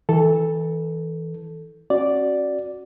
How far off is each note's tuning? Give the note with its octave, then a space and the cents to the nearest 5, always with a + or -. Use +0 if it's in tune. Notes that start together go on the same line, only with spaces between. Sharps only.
E3 -25 A4 +0
C#4 -35 F#4 +0 D5 +0